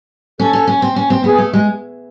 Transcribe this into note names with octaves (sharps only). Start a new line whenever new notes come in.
C#4 A4
C#4
C#4
C4
C#4
C4
B3 G#4
A3
G#3